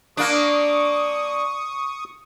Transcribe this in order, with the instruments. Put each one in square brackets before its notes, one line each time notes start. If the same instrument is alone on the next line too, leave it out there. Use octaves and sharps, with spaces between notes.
[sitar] A#3 D4 [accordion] C#6 D#6